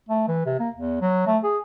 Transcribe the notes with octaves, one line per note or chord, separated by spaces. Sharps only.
A3
E3
C3
A#3
E2
F#3
A3
G#4